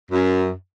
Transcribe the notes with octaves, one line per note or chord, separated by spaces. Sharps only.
F#2